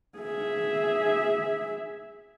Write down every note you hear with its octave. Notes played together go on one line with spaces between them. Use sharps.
G#4 E5